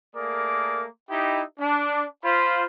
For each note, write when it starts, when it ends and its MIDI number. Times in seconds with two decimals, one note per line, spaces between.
0.15 0.86 57
0.15 0.86 58
0.15 0.86 68
0.15 0.86 70
0.15 0.86 74
0.15 0.86 86
1.10 1.42 63
1.10 1.42 64
1.10 1.42 67
1.60 2.05 62
2.25 2.66 65
2.25 2.66 72
2.25 2.66 83